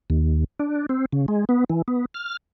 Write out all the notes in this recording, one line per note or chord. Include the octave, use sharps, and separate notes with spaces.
D#2
D4
C4
C#3
G#3
B3
E3
B3
F6